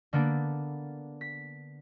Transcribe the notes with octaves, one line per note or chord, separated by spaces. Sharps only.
D3 A#3 B3 D4
B6